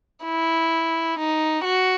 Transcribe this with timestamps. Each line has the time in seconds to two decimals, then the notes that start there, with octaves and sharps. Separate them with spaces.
0.25 E4
1.18 D#4
1.64 F#4